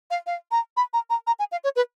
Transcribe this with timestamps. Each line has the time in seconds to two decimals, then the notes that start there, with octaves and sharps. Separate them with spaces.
0.11 F5
0.27 F5
0.51 A#5
0.77 B5
0.93 A#5
1.10 A#5
1.27 A#5
1.39 G#5
1.52 F5
1.64 C#5
1.76 B4